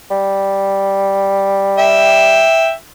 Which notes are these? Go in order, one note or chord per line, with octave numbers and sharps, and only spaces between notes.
G3
E5 G5